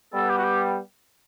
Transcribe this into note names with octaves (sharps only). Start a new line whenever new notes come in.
G3 B3 A4
G4
F#4
G4